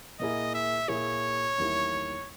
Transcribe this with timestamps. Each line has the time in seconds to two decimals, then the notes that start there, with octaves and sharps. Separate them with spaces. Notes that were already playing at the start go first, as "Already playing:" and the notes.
0.20 A#2 A#3 E4 G#4 D#5
0.54 E5
0.88 A#2 A#3 E4 G#4 C#5
1.58 E2 D#3 G3 A#3 E4